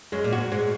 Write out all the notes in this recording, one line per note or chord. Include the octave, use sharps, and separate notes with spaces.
F#2 G#3
A#2
G#2 F#4
G#2 G#3